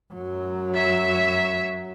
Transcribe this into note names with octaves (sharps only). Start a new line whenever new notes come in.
F#2 F#3
C#5 E5